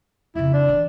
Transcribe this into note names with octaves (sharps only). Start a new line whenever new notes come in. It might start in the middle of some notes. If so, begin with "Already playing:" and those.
F2 C#3 E4
D4
D#3 E3